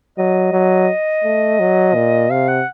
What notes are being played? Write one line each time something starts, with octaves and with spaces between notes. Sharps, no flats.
F#3 D#5
F#3
A3
F#3
A#2
C3 F5
F#5